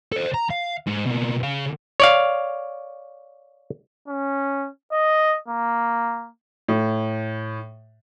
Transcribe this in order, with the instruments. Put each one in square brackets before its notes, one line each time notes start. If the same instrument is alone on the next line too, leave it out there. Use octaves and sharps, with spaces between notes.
[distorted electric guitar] A4 C5
A#5
F5
G#2
B2 A#3
C#3 F5
[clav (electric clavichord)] C#5 D5 F5
[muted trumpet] C#4
D#5
A#3
[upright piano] A2